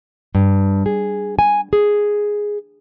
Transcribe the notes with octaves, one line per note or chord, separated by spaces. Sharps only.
G2
G#4
G#5
G#4